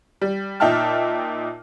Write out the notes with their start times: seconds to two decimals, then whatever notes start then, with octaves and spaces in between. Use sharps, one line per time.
0.22 G3
0.60 A#2 D#4 E5 G5 A5 F6